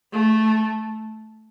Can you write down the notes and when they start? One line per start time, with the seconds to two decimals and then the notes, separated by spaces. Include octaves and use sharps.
0.12 A3